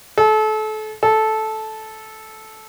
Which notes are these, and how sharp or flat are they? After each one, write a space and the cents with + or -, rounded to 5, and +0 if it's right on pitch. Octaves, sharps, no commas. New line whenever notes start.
A4 -30
A4 -10